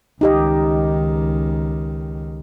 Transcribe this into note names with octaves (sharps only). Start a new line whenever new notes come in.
C#2 D#3 D#4 G4 D#5